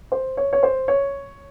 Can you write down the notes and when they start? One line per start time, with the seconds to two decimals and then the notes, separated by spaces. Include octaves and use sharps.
0.12 C5
0.37 C#5
0.53 C#5
0.63 C5
0.88 C#5